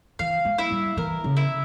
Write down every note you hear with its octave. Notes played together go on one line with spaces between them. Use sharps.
E3 F5
G#3
E4
G3
E3 A#4
C#3
E4